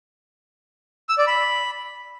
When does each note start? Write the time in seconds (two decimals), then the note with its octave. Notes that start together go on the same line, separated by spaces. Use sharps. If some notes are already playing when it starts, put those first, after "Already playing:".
1.09 E6
1.18 D5
1.27 B5